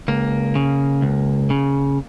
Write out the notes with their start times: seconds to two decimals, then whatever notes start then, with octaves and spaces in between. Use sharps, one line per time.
0.08 C#2 A#3
0.55 C#3
1.02 C#2
1.50 C#3